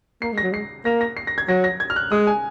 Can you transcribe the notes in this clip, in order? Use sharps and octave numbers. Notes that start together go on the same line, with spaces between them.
A#3 C7
G#3
A#6
F#3
G#3 C7
A#3 A#6
A#6
C7
A#6
G#6
F#3 A#6
A#6
G#6
F6
F#6
G#3 D#6
G#5